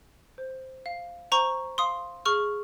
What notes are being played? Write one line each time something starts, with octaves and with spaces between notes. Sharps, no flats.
C5
F5
C5 A#5 C#6
F5 C6 D#6
G#4 C#6 F6